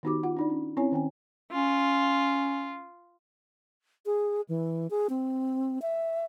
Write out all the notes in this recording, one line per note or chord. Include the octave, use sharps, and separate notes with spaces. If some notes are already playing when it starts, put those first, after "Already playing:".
D#3 B3 D#4 F#4 G4 D6
F4 F#5
D4 D#4 D5
C#4
C4 C#4 E4 C#5 G#5
D#3 C#4 G5 G#5
C#4 F4
G#4
E3
G#4
C4
E5